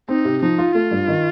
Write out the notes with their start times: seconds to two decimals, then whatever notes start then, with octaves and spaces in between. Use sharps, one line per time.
0.09 C4 D#4
0.25 C3
0.42 F3 D#4
0.58 F4
0.75 A3 F4
0.91 G2
1.08 D#3